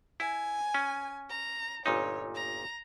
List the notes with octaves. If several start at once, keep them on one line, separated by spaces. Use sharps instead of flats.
E4 G#5
C#4
A#5
G1 A#2 D#4 C#5
A#5